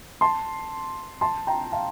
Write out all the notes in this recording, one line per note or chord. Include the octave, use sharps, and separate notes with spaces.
A5 C6
A5 C6
G5 A#5
F5 A5